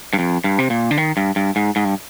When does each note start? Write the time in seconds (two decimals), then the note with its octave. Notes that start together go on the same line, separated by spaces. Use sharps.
0.13 G2
0.19 F2
0.44 G2
0.59 C3
0.70 A#2
0.91 D3
0.97 D#3
1.17 G2
1.36 G2
1.56 G#2
1.76 G#2
1.85 G2